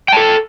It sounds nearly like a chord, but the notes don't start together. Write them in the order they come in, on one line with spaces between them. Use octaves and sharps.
G5 A5 A4